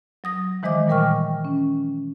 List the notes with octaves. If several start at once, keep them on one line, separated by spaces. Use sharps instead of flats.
F#3 D#6 A#6
D#3 E3 G#3 C5 D#5 D6
A#2 G3 A#4 G5 C#6 F6
C#4